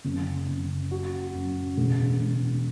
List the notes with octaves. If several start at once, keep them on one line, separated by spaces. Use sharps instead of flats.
F#1
F#1
F#4
F#2
E1
E1